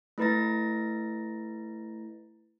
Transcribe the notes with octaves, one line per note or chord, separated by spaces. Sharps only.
A3 E4 B4 A#5 A6 A#6